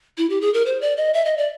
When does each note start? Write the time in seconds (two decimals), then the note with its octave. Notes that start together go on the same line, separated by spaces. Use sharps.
0.18 E4
0.30 G4
0.41 G#4
0.54 A#4
0.66 C5
0.81 D5
0.97 D#5
1.14 E5
1.25 D#5
1.37 D5